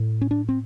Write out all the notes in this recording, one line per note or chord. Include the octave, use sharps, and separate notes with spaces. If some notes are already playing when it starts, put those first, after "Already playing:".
Already playing: A2
C#4
D4
C4